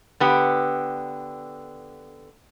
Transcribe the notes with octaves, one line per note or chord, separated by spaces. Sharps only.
D3 B3 G4